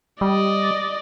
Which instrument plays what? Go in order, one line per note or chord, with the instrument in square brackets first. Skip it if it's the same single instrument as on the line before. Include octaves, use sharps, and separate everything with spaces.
[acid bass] G3 [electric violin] D5 D#5